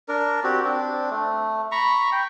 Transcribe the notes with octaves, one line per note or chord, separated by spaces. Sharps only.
D4 A#4
C4 F#4 G4
C4 D4
A3
A#5 B5 C#6
G5